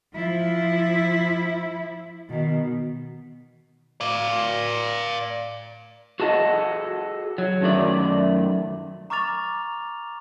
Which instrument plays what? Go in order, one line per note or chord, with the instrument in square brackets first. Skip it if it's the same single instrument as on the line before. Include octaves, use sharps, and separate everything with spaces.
[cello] F3 E4
B2 D#3
[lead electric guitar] D5 F5
[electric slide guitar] F#4 G#4 A4 D#5 F#5
F#3
F#2 D#3 A3 D5
[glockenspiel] A#5 C#6 D6 F6 A6 F7